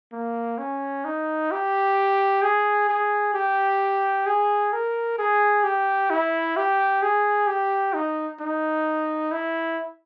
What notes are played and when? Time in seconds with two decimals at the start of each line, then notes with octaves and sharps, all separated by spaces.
0.12 A#3
0.58 C#4
1.05 D#4
1.51 G4
2.43 G#4
2.89 G#4
3.34 G4
4.26 G#4
4.73 A#4
5.18 G#4
5.64 G4
6.10 E4
6.57 G4
7.02 G#4
7.47 G4
7.94 D#4
8.41 D#4
9.32 E4